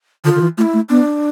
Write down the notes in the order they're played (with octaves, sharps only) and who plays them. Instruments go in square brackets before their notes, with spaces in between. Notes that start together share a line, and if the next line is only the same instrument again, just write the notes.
[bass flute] D3 [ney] F4
[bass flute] D3
E3
[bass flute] A3 [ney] F4
[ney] E4
[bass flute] A3
[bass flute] B3 [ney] D4